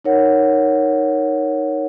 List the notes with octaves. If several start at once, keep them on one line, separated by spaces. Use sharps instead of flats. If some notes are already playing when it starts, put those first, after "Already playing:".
D#4 A#4 C#5 F#5